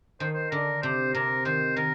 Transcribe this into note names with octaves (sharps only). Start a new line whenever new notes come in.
D#3 C5
C5
D3 A#4
C3 C5
C3 A#4
D#3 C5
D#3 A#4